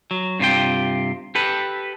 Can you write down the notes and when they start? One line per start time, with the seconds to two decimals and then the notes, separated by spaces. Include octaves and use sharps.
0.11 F#3
0.39 G2 C3 F4 G5
1.35 G4 A4 B4